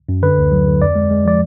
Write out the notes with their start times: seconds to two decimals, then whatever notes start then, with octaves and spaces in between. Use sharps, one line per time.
0.09 F#2
0.22 D3 B4
0.38 D2
0.52 F#3
0.67 D3
0.82 F2 D5
0.95 G#3
1.11 G#3
1.25 F3 D5